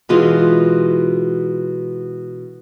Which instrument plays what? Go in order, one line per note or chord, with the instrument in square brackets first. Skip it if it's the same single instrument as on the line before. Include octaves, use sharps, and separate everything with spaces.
[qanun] B2 E3 G#3 F4